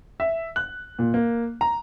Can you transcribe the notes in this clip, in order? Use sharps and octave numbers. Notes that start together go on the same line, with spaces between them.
E5
F#6
A#2
A#3
A#5